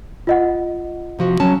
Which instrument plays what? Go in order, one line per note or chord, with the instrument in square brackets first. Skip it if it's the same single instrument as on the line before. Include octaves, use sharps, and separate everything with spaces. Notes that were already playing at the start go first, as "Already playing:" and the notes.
[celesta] F4 D#5 F#5
[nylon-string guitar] C3 F3 F#4
F#3 C#4 A5